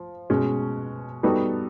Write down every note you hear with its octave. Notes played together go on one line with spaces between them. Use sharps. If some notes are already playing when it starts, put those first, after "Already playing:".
Already playing: F3
B2 G#3 C#4 F#4
G3 B3 D#4 F#4 A4